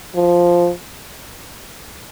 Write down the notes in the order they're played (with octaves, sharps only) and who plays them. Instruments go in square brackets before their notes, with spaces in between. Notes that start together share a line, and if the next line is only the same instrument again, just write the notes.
[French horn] F3